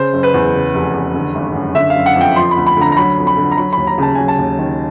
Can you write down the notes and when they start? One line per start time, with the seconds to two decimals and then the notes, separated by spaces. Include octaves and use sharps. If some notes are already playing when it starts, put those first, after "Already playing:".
Already playing: C#3 C5
0.13 F#1
0.23 B4
0.34 E2
0.55 C#3
0.74 F1
0.94 E2
1.14 D3
1.35 G#1
1.55 F#2
1.75 D3 E5
1.90 F5
1.96 F#1
2.06 F#5
2.15 F2
2.21 G5
2.36 F3 C6
2.51 B5
2.56 D2
2.67 B5
2.77 D3 A#5
2.92 A#5
2.97 F#3 B5
3.17 F2
3.27 B5
3.36 D3
3.52 A#5
3.57 F#3 B5
3.73 D#2 B5
3.87 A#5
3.98 C#3 A5
4.15 F#3 G#5
4.28 A5
4.38 D#2
4.59 D#3